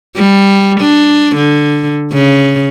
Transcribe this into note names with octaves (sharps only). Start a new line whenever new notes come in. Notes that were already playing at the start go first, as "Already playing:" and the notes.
G3
D4
D3
C#3